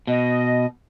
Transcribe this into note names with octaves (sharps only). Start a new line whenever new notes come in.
B2 D#5